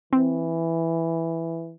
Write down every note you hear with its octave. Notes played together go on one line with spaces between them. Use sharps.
E3 C4